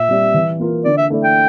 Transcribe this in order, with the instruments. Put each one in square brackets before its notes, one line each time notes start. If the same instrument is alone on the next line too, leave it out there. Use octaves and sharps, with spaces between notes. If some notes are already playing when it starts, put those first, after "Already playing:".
Already playing: [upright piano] A#2 [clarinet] E5
[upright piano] G3 C4 G4 D5
E3
A#3 F4 A#4
[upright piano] D3 [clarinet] D5
[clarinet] E5
[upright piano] A3 E4 A4 D5
[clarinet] G5